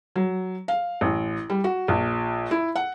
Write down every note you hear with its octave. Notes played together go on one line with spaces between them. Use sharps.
F#3
F5
A1
G3
F#4
A#1
E4
F#5